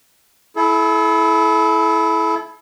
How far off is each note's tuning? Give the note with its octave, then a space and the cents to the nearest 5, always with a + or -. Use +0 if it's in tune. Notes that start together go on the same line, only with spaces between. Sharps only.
E4 +0 A4 -40